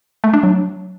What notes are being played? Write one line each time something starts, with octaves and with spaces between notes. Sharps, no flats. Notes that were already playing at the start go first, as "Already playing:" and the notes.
A3
D4
F#3